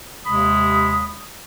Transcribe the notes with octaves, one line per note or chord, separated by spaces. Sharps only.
D#2 C3 G#3 B5 D#6